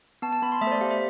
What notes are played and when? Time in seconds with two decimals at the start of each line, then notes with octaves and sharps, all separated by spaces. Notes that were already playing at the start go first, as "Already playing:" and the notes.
0.22 B3 A5
0.33 A5
0.42 B3 B5
0.52 C6
0.61 A3 E5
0.67 C5
0.72 D5
0.81 G4 F5
0.91 E5